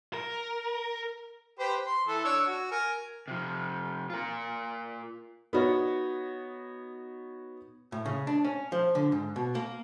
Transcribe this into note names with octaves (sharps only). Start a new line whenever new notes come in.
A#4
G4 B4 C5
C6
E3 A4
D4 C#5 E6
F#4
A#4 G#5
C3 F3
F4 A#4
B3 D#4 F#4 C#5
A2
C#3
D4
C#4
F3
D3
G#2
B2
A#3